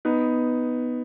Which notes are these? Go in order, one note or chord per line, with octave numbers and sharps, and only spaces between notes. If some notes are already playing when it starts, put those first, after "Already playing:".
B3 D#4